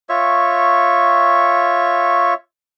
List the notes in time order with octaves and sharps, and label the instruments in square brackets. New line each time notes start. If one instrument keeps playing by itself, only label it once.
[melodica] F4 C#5 E5 C#6